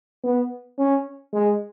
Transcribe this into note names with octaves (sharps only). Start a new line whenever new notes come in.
B3
C#4
G#3